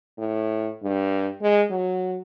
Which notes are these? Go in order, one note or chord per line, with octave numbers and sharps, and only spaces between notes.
A2
G2
G#3
F#3